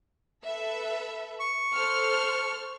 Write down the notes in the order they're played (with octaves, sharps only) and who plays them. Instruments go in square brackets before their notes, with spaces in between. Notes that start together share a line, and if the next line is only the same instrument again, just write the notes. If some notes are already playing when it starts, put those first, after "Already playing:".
[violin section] A4 B4 E5
[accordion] C#6
[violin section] A4 C5 F6